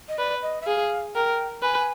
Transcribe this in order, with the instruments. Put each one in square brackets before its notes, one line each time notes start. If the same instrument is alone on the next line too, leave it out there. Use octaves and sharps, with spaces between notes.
[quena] D#5
[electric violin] B4 [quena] D5
[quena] D#5
E5
[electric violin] G#4 [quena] F5
[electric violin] A#4 [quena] G5
[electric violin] B4 [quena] G#5